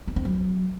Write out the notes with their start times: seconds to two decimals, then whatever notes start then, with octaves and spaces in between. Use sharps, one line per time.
0.08 B3
0.16 C4
0.25 F#3